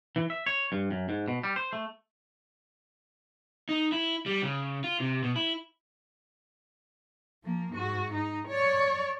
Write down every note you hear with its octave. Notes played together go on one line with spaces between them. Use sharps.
E3
E5
C#5
G2
F#2
G#2
B2
G3
C5
A3
D#4
E4
G3
C#3
F4
C3
B2
E4
F3 A#3
G#2 F#4
D#4
C#5 D5